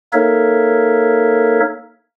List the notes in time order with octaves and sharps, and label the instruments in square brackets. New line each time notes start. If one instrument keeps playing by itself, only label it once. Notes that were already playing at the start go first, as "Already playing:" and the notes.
[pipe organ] A#3 D#4 A4 A#4 C#5 E5